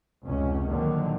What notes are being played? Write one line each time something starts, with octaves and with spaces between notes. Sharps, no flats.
F1 C#2 C#4
D#2 A#2 D3 D#3 F3 F#3